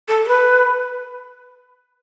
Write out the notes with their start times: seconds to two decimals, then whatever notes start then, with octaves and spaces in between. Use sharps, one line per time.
0.08 A4
0.24 A4
0.28 B4